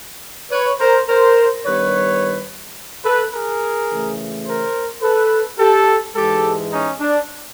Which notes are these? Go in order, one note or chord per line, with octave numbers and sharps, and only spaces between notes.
B4 C#5
A#4 C5
A#4 C5
G2 D#3 G3 B3 B4 C#5
A4 B4
G#4 A#4
C#3 E3 A3
A#4 C5
A4 B4
G4 A4
G#2 E3 G#3 G4 A4
C#4 D#4
D4